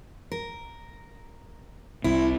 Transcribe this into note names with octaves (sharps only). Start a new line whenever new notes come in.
A#4
C2 C3 E4